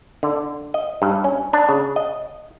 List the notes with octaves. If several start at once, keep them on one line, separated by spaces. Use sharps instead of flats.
D3
D#5
G2
C#4
D4
C#3
D#5